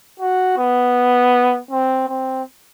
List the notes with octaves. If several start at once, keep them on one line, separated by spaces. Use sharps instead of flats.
F#4
B3
C4
C4